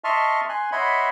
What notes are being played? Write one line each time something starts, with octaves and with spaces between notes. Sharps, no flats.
D#5 E5 A5 C6 C#6 F6
G#5 C6 F#6
C#5 D#5 E5 F#5 B5 C6